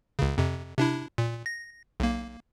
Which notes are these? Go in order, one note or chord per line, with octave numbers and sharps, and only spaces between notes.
C#2 C#3
F2 C3
C3 D4 E4
A#2
A#6
B1 A#3